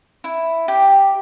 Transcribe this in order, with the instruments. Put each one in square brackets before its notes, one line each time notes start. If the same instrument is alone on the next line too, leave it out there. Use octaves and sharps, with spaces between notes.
[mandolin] E4
G4